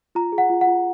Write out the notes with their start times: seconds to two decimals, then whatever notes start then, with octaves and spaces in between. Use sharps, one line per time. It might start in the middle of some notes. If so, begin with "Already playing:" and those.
0.15 F4 A#5
0.32 G#4
0.38 F#5
0.50 F4
0.61 F#5
0.67 F4